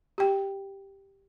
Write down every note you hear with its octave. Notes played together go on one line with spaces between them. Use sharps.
G4 G5